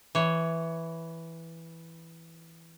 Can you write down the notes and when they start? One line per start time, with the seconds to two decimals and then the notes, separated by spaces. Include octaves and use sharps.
0.15 E3 C#5